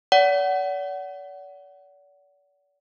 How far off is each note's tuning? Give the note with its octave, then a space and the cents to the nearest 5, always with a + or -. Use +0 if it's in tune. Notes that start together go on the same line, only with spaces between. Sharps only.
D5 -40 F#5 +15